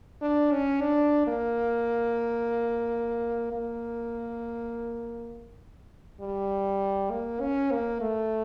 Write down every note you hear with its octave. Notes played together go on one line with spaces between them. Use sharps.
D4
C#4
D4
A#3
A#3
G3
A#3
C#4
A#3
A3